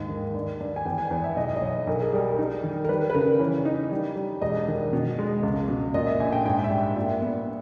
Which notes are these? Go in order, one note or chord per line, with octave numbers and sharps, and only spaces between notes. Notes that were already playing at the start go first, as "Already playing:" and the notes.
Already playing: D#2 G#2 D#5
D#3
G2
G2
G#5
E2 G5
G#5
E2
E5
B1 D#5
D#5
B1 C#5
B1 A#4
G#4
G3 A#4
D#4
D#3
A#4
G3 B4
B4
C#3 A#4
E3 C#5
D#4
G3
G3
E1 D#5
D#3
B2
G#3
C#2
B2
A#2 D#5
E5
A#1 G#5
G5
G#2 G5
E5
G3 G5
A#2 E5
B3